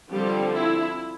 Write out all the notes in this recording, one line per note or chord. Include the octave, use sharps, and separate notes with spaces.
D3 F3 G3 C4 G4
E4